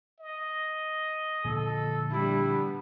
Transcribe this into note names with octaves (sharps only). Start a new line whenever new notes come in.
D#5
A#2 D3 F3 A4
G3 D4 E4
B3